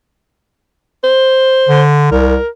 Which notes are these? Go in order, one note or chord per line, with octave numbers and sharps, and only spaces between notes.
C5
D3
C2 A#4